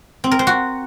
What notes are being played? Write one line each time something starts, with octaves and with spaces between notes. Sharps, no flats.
C4
A#4
C5
F#4